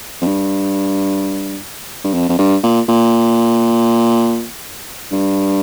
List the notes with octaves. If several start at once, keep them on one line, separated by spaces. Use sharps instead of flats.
F2
G2
G2
F2
F2
G2
A#2
A#2
G2